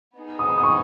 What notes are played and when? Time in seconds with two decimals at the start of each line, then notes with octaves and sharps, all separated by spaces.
0.15 B3 D#4 G#4
0.39 D#6
0.58 D#6
0.63 C#6